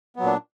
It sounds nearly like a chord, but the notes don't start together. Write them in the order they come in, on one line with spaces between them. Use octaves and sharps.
B3 F#3 A#2 D4